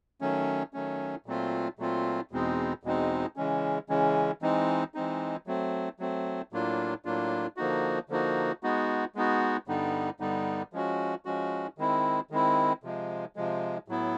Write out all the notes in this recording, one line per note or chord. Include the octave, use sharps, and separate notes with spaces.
D#3 F#3 A3 C#4
D#3 F#3 A3 C#4
A#2 F#3 A3 C4 F4
A#2 F#3 A3 C4 F4
E2 B2 G#3 C4 D#4
E2 B2 G#3 C4 D#4
C#3 E3 G#3 C#4
C#3 E3 G#3 C#4
E3 G#3 C4 D#4
E3 G#3 C4 D#4
F#3 A3 C4
F#3 A3 C4
A2 F#3 A#3 D4 F4
A2 F#3 A#3 D4 F4
D3 F3 A#3 D#4 F#4
D3 F3 A#3 D#4 F#4
G#3 B3 D#4 F#4
G#3 B3 D#4 F#4
G2 D3 G3 B3 D#4
G2 D3 G3 B3 D#4
F3 G#3 C#4 F#4
F3 G#3 C#4 F#4
D#3 G#3 C4 E4
D#3 G#3 C4 E4
C3 F3 G#3
C3 F3 G#3
A2 F#3 B3 E4